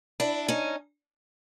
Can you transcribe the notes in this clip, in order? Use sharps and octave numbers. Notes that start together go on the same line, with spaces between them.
D4 E4
C#4 D#4